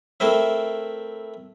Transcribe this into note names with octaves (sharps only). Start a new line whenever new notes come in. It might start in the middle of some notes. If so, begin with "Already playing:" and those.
A3 C4 E4 A#4 C5 E5